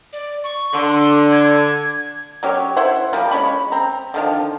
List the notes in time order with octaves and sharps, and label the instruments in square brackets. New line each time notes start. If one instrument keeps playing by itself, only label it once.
[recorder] D5
C#6
[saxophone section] D3 [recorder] C6
[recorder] G#6
[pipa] F#3 C#4 G4 C#5
E4 C5 F#5
F3 G3 A#3
G#3 C#4 B5
C4 A#5
D3 D#3 F3